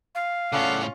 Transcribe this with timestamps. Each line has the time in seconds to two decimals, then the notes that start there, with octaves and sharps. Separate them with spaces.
0.15 F5
0.52 A2 C#3 C#4 F4 A4 D5 F#5